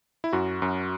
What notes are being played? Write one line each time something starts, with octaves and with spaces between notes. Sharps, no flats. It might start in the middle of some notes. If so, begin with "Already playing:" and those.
E4
F#2 F#4
F#2